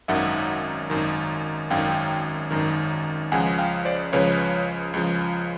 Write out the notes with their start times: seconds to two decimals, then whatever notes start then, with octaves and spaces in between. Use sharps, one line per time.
0.08 G#1 F#2 D#3 E5 F#5
0.90 G#1 F#2 D#3
1.70 G#1 F#2 D#3 F5 G5
2.51 G#1 F#2 D#3
3.32 C#2 C#3 F3 F#5 G#5
3.59 F5 G5
3.85 C5 D5
4.13 C#2 C#3 F3 B4 C#5
4.94 C#2 C#3 F3